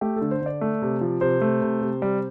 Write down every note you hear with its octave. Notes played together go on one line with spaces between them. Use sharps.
A3 G4
A4
D3
C5
D3 D5
A3
C3
F3
C3 C5
A3
C3
C3
G3